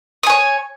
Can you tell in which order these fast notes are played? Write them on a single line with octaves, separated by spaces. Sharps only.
D#6 G#5 C#5